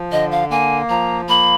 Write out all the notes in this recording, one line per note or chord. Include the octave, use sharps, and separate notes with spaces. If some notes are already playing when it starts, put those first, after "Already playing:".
Already playing: F3
D3 D#5
F5
A#3 G#5
F3 A#5
A#3 B5